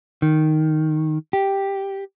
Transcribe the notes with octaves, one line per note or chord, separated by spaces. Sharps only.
D#3
G4